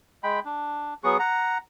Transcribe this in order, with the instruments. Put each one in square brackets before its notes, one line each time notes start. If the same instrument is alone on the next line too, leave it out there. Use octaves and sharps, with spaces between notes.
[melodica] G#3 G5 B5
D4
F#3 B3 G#4 C#6
F#5 A#5